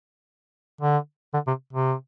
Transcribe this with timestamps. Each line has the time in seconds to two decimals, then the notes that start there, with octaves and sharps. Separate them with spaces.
0.81 D3
1.34 D3
1.47 C3
1.73 C3